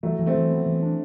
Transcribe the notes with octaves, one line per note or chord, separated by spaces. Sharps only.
E3 F#3 A3
E3
A3 C4
E3
B3
E3
D4